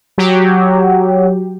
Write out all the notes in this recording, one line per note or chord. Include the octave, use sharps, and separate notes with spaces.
F#3 G4